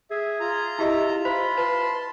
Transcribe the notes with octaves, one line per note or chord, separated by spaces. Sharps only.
G#4 E5
F4 A#5
E4 G4 D#5 E5
F4 C5 B5
B4 A5 C6